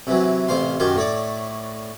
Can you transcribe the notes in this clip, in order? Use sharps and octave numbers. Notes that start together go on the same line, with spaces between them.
C3 E3 F#3
A1 C3 C5 F5 C6
F#2 D#3 F#3 G4 C6
A2 C#5 D5